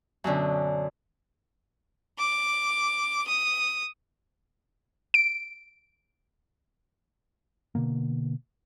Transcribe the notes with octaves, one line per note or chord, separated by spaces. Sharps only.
F#2 B2 D3 C#4
D6
D#6
D7
B2 D3 A#3